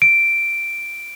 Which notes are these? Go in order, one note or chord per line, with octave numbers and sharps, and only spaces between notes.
D7